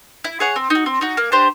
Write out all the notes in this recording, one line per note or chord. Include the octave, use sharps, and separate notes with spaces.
E4
G#4 C#5 F#5
C4
D#4 F#4
C4
D#4 F#4
A#3
D4 G4 C5